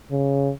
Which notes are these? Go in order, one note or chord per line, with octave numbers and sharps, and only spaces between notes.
C#3